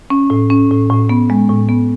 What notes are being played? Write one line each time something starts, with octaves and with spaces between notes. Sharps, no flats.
C#4
A2
C#4
A2
A2
B3
G#3
A2
B3